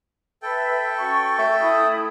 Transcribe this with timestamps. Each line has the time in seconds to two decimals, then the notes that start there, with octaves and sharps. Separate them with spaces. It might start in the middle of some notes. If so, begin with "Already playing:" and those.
0.42 A4 B4 E5 G5
0.98 C#4 F#4 C#6
1.39 A3
1.61 E4 B5 D#6